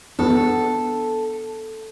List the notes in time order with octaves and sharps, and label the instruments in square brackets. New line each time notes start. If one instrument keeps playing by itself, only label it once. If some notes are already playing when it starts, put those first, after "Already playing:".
[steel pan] B3 D4 [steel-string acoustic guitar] A4